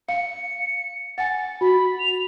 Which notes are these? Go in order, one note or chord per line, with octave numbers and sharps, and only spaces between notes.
F5 C#7
F#5 G#5 A6
F#4 B5
F7